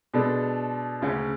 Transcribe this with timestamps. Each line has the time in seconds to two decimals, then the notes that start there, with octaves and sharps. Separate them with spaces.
0.14 B2 G#3 D4 A4
1.02 D2 C#3 G#3 C#4